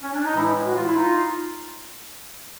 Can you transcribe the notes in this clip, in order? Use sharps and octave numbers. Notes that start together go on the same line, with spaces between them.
C#4
D4
D#4
A2 E3 G#3 D4 E4
F#4
F4
E4
D#4 F4